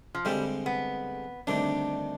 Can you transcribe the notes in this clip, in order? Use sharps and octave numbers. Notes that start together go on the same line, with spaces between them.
F3
G2 D3 G3 G#3 C4
B3
D2 C3 D#3 G3 D4